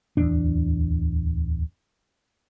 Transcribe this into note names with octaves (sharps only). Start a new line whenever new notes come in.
D1 E2 D4